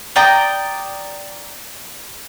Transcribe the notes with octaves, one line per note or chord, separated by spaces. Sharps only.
D5 G5 A#5 D#6